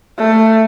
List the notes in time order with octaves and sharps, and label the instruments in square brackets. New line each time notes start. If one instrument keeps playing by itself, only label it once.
[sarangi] A3